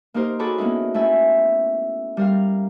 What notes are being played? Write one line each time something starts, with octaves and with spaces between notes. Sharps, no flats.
A#3 D#4 G4 A#4 C5
F#4 G#4 A4 C#5 B5 D6
A#3 B3 C#4 D#4 E4
A3 C#4 E4 E5 G#5
G3 A#4 F5